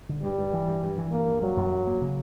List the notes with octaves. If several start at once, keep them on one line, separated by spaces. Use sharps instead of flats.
D3
G2 G3
G2
E3
G2
G2
E3
G2 A#3
G2
F#3 G3
F#2
F#2
A#3
C#3